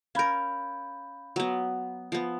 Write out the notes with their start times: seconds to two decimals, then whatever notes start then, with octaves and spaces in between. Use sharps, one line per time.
0.15 C#4 A#4 F5 B5 G6
1.36 F#3 B3
2.12 F3 B3